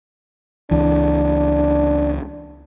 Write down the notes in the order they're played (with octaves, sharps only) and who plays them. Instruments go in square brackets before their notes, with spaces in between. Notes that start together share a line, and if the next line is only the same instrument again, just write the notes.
[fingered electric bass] C#2 E3 [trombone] D4